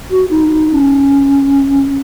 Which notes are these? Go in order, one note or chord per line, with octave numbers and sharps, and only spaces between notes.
F#4
D#4
D#4
C#4